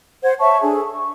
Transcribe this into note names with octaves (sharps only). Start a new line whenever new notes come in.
C5 F#5 G#6
C#5 E5 A5 C#6
D4 G#4 A4
C#6